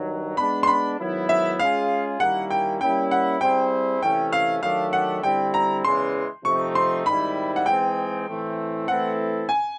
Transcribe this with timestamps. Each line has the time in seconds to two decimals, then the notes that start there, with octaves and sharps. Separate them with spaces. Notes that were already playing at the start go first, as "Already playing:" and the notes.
Already playing: G2 D#3 F#3
0.37 G#3 B3 D4 B5
0.63 C6
0.67 B5
0.99 G#2 D#3 F#3 B3 E4
1.29 E5
1.59 G#3 C#4 F4 G#4 F5
2.20 D#3 G3 A#3 C#4 E4 F#5
2.51 G5
2.81 G3 A#3 C#4 E4 G5
3.11 F#5
3.41 G3 C4 E4 G#4 C5 G5
4.02 C3 E3 A3 C#4 G5
4.32 F5
4.63 D#3 F#3 A3 D4 G4 F5
4.93 F#5
5.23 D3 G3 C4 E4 G5
5.54 A#5
5.84 E2 C#3 E3 G#3 C6
6.44 C3 F3 A3 C4 D#4 C#6
6.75 C6
7.05 G#2 D#3 G3 C4 E4 B5
7.56 F#5
7.66 E3 G#3 C4 D#4 G#4 G5
8.27 A2 E3 A3 C4
8.88 E3 A3 C4 E4 A4 F#5
9.49 G#5